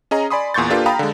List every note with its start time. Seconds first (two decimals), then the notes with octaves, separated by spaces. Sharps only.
0.11 C#4 G#4 D#5 A#5
0.30 D5 G#5 B5 C6 D#6
0.54 E2 A#2 C6 C#6 G6 A6
0.70 A#3 D4 F4 G4 A4 B4
0.86 F5 G5 A#5 B5 D#6
0.99 D3 G#3